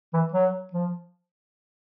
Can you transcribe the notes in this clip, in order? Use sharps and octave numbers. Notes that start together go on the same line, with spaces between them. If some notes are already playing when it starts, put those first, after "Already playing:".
E3
F#3
F3